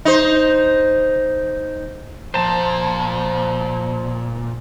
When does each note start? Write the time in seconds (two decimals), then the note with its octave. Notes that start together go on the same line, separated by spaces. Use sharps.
0.05 D#4 C5
2.34 A#2 F3 C5 A5